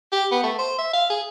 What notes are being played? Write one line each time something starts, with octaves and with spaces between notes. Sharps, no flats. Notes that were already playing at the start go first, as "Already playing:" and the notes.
G4
B3
A3
C5
E5
F5
G#4